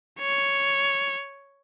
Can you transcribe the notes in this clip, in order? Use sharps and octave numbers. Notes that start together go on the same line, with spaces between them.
C#5